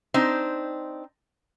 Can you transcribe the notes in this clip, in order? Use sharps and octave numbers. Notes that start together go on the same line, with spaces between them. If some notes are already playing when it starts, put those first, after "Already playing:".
C4 D4 D#4 C5